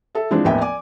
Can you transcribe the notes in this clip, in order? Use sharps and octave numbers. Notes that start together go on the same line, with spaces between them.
A4 E5
E3 F3 G#3 C4 D4
A1 D#2 B3 E5 G5 G#5
D5 G#5 D6